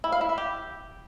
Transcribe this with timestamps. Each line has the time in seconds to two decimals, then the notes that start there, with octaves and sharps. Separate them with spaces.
0.04 E4
0.12 F5
0.21 E4
0.29 E5
0.38 G4